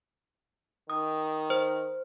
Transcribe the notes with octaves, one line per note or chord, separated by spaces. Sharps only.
D#3 D#6
C5